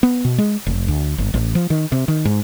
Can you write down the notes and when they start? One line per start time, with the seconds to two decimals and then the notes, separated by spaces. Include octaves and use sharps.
0.03 B3
0.25 B2
0.38 G#3
0.67 F1
0.88 D2
1.18 G1
1.34 A1
1.55 F3
1.70 D#3
1.92 C3
2.08 D#3
2.25 G#2